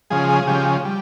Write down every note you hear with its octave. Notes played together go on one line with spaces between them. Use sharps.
C#3 F3 G#3 G#4
G#4
C#3 F3 G#3 G4
G3